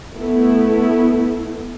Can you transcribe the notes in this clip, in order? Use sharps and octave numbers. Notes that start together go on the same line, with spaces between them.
A3 B3 E4